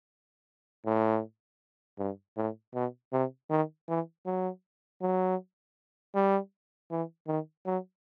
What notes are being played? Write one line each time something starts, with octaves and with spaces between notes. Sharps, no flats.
A2
G2
A2
B2
C3
D#3
E3
F#3
F#3
G3
E3
D#3
F#3